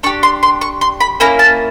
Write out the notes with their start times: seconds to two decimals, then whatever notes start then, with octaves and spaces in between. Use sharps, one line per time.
0.03 D4 C#6
0.06 G4
0.23 C6
0.43 C6
0.61 C#6
0.81 C6
1.01 B5
1.20 A#3 C#4 E4 A#5
1.39 A5